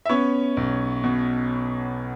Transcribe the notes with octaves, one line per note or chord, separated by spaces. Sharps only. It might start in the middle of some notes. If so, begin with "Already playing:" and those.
E5
B3 C#4 C#5
B1
B2